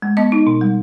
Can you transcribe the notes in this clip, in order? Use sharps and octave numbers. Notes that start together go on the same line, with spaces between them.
G#3
B3 D#5
D#4
B2
G3